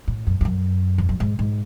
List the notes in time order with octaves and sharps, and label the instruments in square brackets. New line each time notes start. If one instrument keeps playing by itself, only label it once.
[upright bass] A2
F#2
E2
F#2
E2
F#2
G#2
G#2